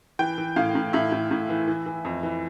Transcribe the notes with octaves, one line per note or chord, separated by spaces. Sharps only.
E3 G5
E3
A2 F5
A2
A2 E5
A2
A2
E3
E3
E3
F2
E3